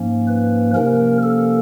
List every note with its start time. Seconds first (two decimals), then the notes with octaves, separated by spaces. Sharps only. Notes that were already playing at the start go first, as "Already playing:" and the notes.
Already playing: G#2 F3 A#3 C#4
0.27 B4
0.74 C3 F3 A#3 C#4 A#4
1.23 A4